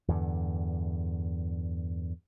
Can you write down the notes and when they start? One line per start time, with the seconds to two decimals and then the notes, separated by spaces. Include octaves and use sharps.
0.08 E2 G2 D3